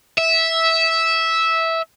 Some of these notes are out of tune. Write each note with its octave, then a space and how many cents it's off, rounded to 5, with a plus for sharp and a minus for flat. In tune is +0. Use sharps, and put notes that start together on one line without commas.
E5 -10